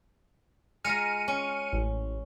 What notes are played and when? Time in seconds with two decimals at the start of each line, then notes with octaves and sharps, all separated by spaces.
0.85 G#3 F4 A#5 F6 C#7 D#7
1.28 C#4
1.73 A1